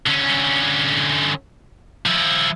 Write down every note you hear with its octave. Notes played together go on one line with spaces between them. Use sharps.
D3 C#4
F3 E4